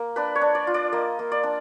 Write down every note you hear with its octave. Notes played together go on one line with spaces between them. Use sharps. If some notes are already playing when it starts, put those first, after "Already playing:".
Already playing: A#3
D4 B4
C#5
D4
D5
F4
D5
A#3 D#5
A#3
D5
D4